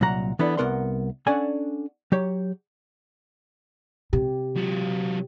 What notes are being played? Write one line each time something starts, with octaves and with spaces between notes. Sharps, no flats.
C2 A#2 F#3 F#5 A#5
E3 B3 D4 E4 A4 D5
C2 E3 B3 A#4 F#5 C6
C#4 D4 A4 D5 F#5 G#5
F#3 G4 C#5
C3 G4
F#3 F4